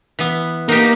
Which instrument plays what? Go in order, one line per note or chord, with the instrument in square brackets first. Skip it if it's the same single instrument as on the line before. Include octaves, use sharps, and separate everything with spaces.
[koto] E3 B3
[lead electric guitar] A#3 [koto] D#4 G4